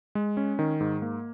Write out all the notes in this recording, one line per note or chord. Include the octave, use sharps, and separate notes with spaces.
G#3
C#4
D#3
G#2
A#3